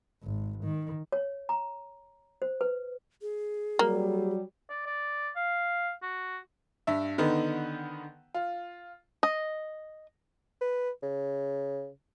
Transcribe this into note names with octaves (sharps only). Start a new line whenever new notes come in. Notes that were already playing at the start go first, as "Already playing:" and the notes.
G#1
D#3
C#5
A#5
C5
B4
G#4
F#3 G3 A#3
D5
D5
F5
F#4
G2 E5
D3 D#3 B3 D#4
F4
D#5
B4
C#3